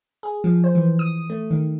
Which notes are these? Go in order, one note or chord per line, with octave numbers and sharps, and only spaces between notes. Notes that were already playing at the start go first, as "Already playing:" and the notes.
G#4
F3
C5
E3
D#6
A3
D#3